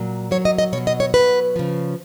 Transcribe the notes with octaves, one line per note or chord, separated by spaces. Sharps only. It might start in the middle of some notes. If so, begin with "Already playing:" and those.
Already playing: A#2 F#3
A#2 F#3 C#5
D#5
D#5
B2 C#5
F#3
D#5
C#5
B2 F#3 B4
C#3 F3